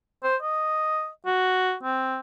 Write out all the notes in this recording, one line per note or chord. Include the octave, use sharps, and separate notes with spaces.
C5
D#5
F#4
C4